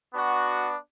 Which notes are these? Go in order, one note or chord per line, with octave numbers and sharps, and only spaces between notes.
B3 D4 F#4